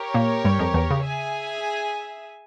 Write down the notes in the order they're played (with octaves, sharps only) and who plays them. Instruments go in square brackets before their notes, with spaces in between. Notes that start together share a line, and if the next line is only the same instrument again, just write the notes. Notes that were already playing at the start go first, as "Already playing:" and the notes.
Already playing: [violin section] G4 A#4 C#5
[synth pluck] A#2 A#3
G2 G3
F2 F3
E2 E3
C#3
[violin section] G#4 E5 G#5